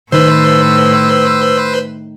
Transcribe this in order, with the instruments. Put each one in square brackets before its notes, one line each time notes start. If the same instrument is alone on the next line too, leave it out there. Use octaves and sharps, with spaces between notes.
[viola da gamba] A2 [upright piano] D#3 [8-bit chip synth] B4 C5 [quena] E6